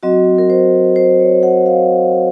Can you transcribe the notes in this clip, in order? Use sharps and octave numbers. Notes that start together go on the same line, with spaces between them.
F#3 C4 F#4 D#5
A#4
C5
C5
C#5
F#5
F5